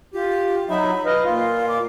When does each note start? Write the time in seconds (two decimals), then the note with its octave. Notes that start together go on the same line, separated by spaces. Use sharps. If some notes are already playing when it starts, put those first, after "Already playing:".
0.14 F4 G4
0.69 F#3 D#4 E5 B5
1.06 B4 D#5 F5
1.24 A#2 F4 F5
1.68 D6